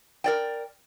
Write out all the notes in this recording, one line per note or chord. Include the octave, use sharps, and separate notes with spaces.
A#4 D5 G5